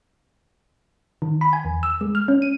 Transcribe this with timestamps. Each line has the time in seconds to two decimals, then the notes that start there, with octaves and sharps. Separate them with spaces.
1.22 D#3
1.41 B5
1.53 G#5
1.65 E2
1.83 E6
2.01 G#3
2.15 F6
2.28 C#4
2.42 D#7